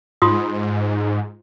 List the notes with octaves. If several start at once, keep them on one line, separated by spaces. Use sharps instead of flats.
G#2 F4 C6 D#6